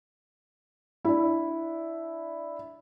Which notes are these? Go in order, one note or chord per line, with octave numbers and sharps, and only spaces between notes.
D4 E4